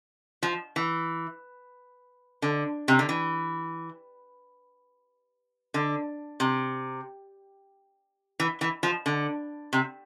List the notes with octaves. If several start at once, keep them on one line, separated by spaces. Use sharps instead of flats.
F3
E3
D3
C3
D3
E3
D3
C3
E3
E3
F3
D3
C3